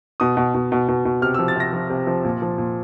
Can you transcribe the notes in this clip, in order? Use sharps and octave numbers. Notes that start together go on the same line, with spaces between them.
B2 D#6
B2
B2
B2
B2
B2
C3 F6
F3 E6
A6
C3 A#6
F3
C3
F3
A#2
F3
A#2